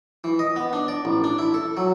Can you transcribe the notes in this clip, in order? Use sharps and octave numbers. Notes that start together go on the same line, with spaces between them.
E3
D#5
B3
D4
D5
A1
D4
E4
A4
F#3